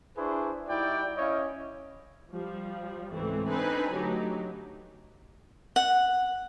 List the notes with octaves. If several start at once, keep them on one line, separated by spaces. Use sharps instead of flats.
D4 E4 G#4 B4 C5 C#6
G3 D#4 E4 F#4 D5 G5
C#4 E4 C#5 D#5 F5
F3 G3
C#2 G#2 E3 A3 C4
C4 D4 D#4 B4 C5 G#5
D3 F#3 A3 D#4 G4
F#5